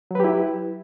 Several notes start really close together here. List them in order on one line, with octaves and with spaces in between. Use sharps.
F#3 B4 G4 E4